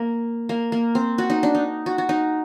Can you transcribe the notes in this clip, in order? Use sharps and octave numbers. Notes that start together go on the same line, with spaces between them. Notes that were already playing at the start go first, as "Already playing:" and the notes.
Already playing: A#3
A#3
A#3
C4
F#4
D#4
D4
D#4
F#4
F#4
D#4